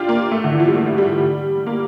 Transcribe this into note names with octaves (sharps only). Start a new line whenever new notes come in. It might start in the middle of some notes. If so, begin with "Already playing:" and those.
Already playing: D4 F4 G4
A#3
A3
D3
E3
F3
G3
A3
G3
A#3